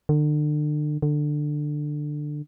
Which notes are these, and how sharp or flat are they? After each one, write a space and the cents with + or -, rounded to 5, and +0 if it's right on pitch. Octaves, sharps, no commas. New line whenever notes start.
D3 +35
D3 +15